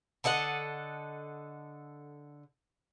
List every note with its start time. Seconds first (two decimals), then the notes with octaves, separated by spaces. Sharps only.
0.24 D3 A4 D#5 F#5